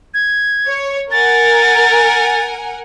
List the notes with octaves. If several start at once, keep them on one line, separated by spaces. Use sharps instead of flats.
G#6
C#5
A#4 F#5 G#5 A6